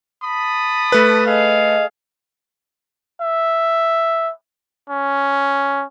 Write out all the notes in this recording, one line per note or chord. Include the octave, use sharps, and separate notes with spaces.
A5 B5 D#6
A3 B4
G#4 A4 D#5 F5
E5
C#4